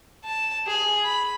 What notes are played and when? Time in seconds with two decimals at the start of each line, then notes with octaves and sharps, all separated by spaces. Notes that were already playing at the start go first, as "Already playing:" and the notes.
0.25 A5
0.67 G#4
1.05 B5